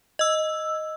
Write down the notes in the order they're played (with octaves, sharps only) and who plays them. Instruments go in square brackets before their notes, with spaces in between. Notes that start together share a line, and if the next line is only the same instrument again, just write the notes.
[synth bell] D#5 E6